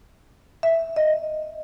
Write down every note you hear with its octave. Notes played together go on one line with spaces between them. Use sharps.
E5
D#5